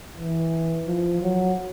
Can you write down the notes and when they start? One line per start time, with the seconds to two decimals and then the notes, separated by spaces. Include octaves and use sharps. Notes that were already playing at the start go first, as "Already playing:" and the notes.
0.19 E3
0.87 F3
1.22 F#3